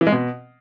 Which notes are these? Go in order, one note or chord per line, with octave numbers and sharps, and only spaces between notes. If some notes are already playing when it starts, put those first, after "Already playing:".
E3
G#3
B2